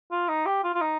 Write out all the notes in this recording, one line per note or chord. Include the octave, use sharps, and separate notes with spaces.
F4
D#4
G4
F4
F4
D#4